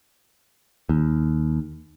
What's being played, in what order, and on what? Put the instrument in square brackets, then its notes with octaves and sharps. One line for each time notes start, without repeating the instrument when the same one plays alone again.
[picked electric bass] D#2